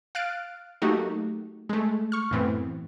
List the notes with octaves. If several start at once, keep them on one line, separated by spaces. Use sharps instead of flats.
F5 F6 F#6 A6 D7
F#3 A3 A#3 D#4 F#4 G4
G#3 A3
C#6 F6
F#2 A2 E3 B3 C4